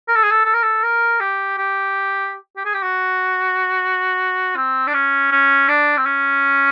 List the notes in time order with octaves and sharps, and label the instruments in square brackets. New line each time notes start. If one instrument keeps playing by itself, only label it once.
[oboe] A#4
A4
G#4
A4
A4
A#4
A4
A#4
G4
G4
G4
G#4
G4
F#4
C4
D4
C#4
C#4
D4
C4
C#4